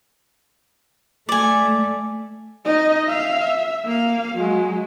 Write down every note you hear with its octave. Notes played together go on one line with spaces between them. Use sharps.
A3 D5 G#5
D#4 D#5
E5 F5
E5
A#3 F5
F#3 G#3